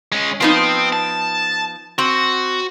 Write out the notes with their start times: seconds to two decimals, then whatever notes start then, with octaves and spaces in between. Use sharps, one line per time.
0.12 G#3 C#4
0.41 F3 B3 C4 D#4
0.93 A5
1.98 C4 F#4